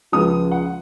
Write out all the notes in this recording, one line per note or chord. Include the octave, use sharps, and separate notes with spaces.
C#2 C#3 F3 G#3 D#6
F#5